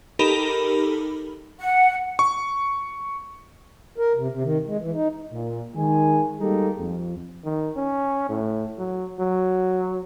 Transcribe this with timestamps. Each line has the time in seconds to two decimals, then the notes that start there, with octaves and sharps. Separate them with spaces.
0.19 D#4 G4 A4 A#4 B5
1.58 F#5
2.19 C#6
3.98 A#4
4.15 C3
4.29 C3
4.43 D#3
4.67 G#3
4.79 E3
4.94 D#4
5.32 A#2
5.75 D#3 G#3 G#5
6.39 G3 G#3 A#3 D#4 G4 A4
6.79 F2
7.44 D#3
7.77 C#4
8.29 A2
8.79 F#3
9.20 F#3